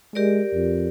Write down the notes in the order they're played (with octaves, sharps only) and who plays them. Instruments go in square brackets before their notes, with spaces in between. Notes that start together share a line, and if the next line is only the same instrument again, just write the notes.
[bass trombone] G#3 [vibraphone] G4 A#4 D5
[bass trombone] F2